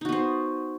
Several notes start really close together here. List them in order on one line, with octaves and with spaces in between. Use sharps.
D#4 F#4 B3 C5